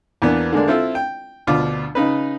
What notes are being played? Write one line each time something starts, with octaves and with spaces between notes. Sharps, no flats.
E2 A#3 B3 D4
D3 G#3 A#3 D4
C4 E4 F4 A4
G5
D2 B2 D4 F4 D6
C#3 D#4 B4